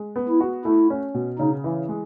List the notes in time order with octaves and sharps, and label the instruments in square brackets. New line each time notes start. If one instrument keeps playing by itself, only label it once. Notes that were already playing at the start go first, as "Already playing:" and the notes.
Already playing: [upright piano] G#3
B3
[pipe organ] E4
[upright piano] F#4
[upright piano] A3 [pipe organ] E4
[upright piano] C#4
B2
[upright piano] C#3 [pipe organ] D#4
[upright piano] E3
G#3